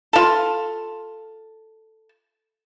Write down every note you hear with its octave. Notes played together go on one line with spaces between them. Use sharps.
F4 A4